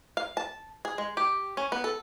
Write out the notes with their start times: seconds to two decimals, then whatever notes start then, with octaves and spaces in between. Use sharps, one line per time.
0.17 F5
0.37 A5
0.85 G#4
0.98 G#3
1.17 G4
1.57 C#4
1.72 B3
1.84 A4